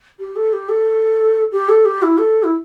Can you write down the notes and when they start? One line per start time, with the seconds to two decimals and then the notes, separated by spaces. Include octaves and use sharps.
0.19 G4
0.36 A4
0.53 G4
0.69 A4
1.52 G4
1.69 A4
1.85 G4
2.02 E4
2.18 A4
2.44 E4